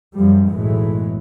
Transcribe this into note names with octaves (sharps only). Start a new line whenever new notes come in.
F#2 F3 G3
B1 F#2 A2 E3 G#3